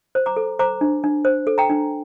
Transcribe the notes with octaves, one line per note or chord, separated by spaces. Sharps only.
C5
A#5 D6
A4
C5 A#5 D6
D4
D4
C5
A4
G5 A#5
D4